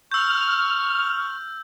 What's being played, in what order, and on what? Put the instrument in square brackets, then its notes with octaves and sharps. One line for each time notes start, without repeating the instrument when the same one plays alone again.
[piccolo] C#6 [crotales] E6 G6 [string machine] F6